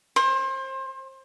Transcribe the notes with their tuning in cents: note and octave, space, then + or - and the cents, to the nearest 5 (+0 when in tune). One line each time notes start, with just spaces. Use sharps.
C5 +30